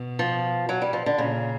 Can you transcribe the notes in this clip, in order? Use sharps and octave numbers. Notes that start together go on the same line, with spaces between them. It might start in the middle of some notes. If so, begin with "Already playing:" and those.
Already playing: B2
F3
F#3
G3
F3
D3
A#2 C#3